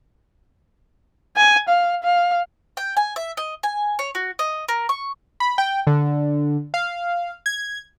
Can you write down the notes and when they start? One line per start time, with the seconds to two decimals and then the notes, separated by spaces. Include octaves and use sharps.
1.37 G#5
1.69 F5
2.04 F5
2.77 G5
2.97 G#5
3.16 E5
3.37 D#5
3.63 G#5
3.99 C#5
4.15 F#4
4.39 D#5
4.68 A#4
4.89 C#6
5.40 B5
5.58 G5
5.87 D3
6.74 F5
7.46 G#6